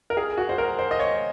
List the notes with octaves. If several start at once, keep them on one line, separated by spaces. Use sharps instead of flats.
A#4
G#4
F#4
C5
A#4
C5
D#5
C#5